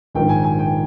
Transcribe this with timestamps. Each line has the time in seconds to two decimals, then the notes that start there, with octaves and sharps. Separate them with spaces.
0.15 A#1 G#2 D#3 G5
0.29 G#5
0.44 G#5
0.59 G5